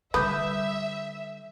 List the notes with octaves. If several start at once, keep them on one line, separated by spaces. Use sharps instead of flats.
D3 G3 B4 E5 D#6 G6